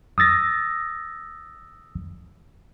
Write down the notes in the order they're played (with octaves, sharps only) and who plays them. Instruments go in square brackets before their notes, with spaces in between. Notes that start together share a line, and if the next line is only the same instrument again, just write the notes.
[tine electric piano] D#6 E6 A6 A#6